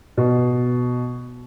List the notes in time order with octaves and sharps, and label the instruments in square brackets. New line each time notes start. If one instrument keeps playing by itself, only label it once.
[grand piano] B2